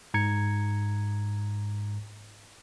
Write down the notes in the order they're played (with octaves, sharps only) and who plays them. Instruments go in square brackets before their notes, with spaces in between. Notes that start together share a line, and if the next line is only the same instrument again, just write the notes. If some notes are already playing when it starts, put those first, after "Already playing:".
[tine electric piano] G#2 A#5 G#6 C#7